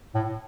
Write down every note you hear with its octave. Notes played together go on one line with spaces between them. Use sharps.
A2